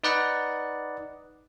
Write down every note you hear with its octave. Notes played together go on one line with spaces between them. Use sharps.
D#4 B4 D5 D#5 F#5